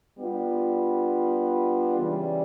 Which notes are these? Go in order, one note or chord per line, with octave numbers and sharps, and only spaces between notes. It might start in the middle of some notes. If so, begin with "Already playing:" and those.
G3 B3 D4 F4
C#3 E3 G3